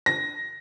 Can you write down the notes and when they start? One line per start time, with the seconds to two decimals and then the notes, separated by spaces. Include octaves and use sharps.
0.06 A#6